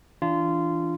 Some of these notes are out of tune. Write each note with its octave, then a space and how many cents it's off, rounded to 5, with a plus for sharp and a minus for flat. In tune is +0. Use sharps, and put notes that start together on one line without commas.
E3 +0 D4 +0 F4 -20